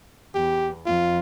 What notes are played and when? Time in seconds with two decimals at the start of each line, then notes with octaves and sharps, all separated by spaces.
0.35 E2 G4
0.86 F2 F4